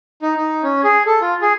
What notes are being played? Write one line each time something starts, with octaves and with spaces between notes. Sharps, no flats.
D#4
D#4
C#4
G#4
A4
F4
G#4